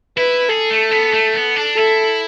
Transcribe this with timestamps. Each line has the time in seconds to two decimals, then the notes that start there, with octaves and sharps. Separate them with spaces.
0.17 E4 B4
0.49 G#4 A4
0.70 A3
0.91 B3
1.13 A3
1.34 B3
1.56 D4
1.77 E4 A4